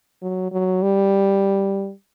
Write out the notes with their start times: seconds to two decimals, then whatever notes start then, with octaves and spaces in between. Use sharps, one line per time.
0.22 F#3
0.52 F#3
0.82 G3